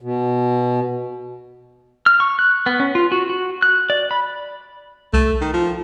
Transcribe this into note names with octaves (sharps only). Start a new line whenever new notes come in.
B2
F6
C#6
F#6
B3
C#4
F4
F#4
F#4
F#6
D5
B5
C2 A3 D#7
D#3
F3